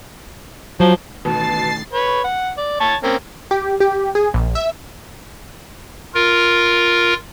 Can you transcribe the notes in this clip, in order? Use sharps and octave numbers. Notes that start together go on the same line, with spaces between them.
F3 F#3
A1 B2 D#3 A3 A5 A6 C7
B4 C#5
F#5
D5
C#5 A5 C#6
A#3 C4 C#4
G4
G4
G#4
A#1
E5
F4 A#4